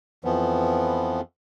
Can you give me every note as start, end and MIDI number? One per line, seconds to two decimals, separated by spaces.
0.25 1.21 41
0.25 1.21 52
0.25 1.21 53
0.25 1.21 59